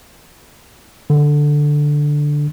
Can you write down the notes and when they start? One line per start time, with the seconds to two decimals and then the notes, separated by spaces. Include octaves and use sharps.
1.10 D3